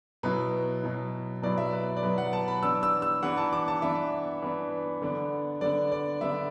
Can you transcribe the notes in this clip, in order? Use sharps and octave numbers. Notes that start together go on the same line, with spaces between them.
B2 F#3 B3 E4 B4
B2 F#3 B3 E4
B2 F#3 B3 E4 D5
E5
B4
D5
B2 F#3 B3 E4 B4
F#5
A5
B5
E3 B3 D4 E6
E6
E6
E3 B3 D4 F#5
A5
D6
A5
E3 B3 D4 E5
E3 B3 D4
D3 B3 D4
D3 B3 D4 D5
D5
D3 B3 D4 E5